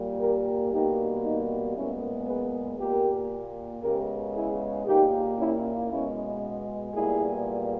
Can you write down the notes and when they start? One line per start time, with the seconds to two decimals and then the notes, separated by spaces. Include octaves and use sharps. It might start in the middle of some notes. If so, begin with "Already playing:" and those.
Already playing: A#2 G3 A#3
0.20 G4 A#4
0.72 B2 G3 A#3 D#4 G4
1.24 D#4
1.76 A#2 G#3 B3 C#4 E4
2.28 G#4 B4
2.79 A#2 A#3 G4 A#4
3.83 C#3 G#3 B3 G4 A#4
4.35 E4 G#4
4.86 A#2 A#3 D#4 G4
5.39 C#4 E4
5.90 B2 G#3 B3 C#4 E4
6.94 A#2 G3 B3 E4 G#4